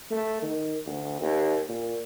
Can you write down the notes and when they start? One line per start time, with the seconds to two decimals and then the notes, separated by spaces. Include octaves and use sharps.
0.11 A3
0.43 D#3
0.86 D2
1.21 D#2
1.69 A#2